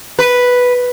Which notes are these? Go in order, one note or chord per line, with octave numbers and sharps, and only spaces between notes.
B4